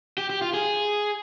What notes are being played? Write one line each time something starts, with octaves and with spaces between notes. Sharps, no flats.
G4
G4
F4
G#4